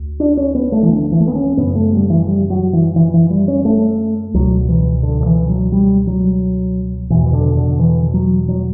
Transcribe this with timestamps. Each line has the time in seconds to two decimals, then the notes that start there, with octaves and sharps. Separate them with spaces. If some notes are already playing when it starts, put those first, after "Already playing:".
Already playing: D2
0.20 D4
0.37 C#4
0.55 B3
0.72 A3
0.83 E3
0.89 D3
1.12 E3
1.20 A3
1.27 B3
1.35 C#4
1.57 F#2 C#3 B3
1.75 A3
1.93 G3
2.10 E3
2.27 G3
2.50 F#3
2.73 E3
2.96 E3
3.14 E3
3.30 G3
3.48 C#4
3.65 A3
4.34 C#2 B2 F#3
4.69 E3
5.03 D3
5.21 D3
5.26 E3
5.49 F#3
5.72 G3
6.07 F#3
7.10 E2 B2 E3
7.26 E3
7.33 D3
7.57 D3
7.79 E3
8.14 F#3
8.48 F#3